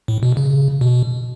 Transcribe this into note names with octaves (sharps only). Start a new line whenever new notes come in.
A2
B2
C#3
B2